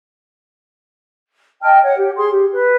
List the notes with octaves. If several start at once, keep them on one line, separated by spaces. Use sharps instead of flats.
D#5 G5 A5 F6
C#5 F#5
G4
G#4 C6
G4
B4